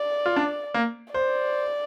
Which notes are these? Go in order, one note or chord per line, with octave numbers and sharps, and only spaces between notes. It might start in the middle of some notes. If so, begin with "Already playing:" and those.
Already playing: D5
F4
D4
A#3
C5 D5